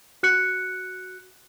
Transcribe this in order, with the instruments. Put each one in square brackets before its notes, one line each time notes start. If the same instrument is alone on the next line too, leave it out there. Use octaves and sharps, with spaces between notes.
[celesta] F#4 F#6 C#7